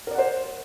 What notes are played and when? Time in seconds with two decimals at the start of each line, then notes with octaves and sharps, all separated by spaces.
0.07 A#4
0.11 D5
0.15 F#5
0.18 C5